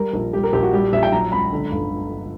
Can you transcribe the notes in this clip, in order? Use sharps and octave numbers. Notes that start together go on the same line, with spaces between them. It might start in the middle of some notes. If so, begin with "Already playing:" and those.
Already playing: G3 A#4
A#1
G3 G4
A#4
A#1 G4
F#4
G3 G4
A#1 E5
G5
F#3 A#5
C#2 B5
D3
G1